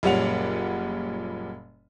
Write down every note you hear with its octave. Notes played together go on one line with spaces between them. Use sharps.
F#1 A#2 G3 C#4 F#5 F7